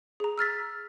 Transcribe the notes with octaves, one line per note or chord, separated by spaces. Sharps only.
G#4 A#5
E6 F6 A6 B6